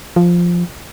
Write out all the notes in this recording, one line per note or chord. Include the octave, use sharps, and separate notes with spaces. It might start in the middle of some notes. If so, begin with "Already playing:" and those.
F3